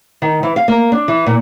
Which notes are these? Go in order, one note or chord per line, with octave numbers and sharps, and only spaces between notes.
D#3
E3
F5
A#3
D4
E3
A#2